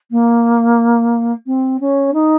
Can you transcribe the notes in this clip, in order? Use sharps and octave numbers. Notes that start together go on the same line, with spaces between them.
A#3
C4
C#4
D#4